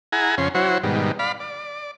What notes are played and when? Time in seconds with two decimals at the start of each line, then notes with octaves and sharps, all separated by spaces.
0.12 E4 G#4 F#5 G#5 A#5
0.38 F2 C#3 C#4 C6
0.55 F#3 E4 F#4 C5 C#5
0.83 G#2 B2 D#3 G3
1.19 D5 F5 B5
1.40 D5